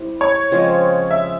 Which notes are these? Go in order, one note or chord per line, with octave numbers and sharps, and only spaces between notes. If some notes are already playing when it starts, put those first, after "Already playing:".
Already playing: G3 C4 E4
C#5
C#3 F3 G#3 C4
E5